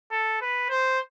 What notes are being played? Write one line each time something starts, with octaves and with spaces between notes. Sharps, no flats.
A4
B4
C5